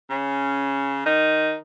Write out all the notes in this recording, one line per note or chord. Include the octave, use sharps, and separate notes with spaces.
C#3 C#4
D#3 D#4